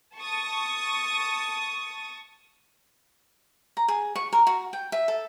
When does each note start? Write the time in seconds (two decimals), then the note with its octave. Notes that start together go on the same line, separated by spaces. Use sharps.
0.17 A5 C#6 D#6
3.77 A#5
3.88 G#4
4.15 C#6
4.33 A#4
4.47 F#4
4.73 G5
4.92 E5
5.08 A4